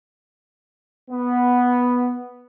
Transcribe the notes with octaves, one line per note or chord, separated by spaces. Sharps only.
B3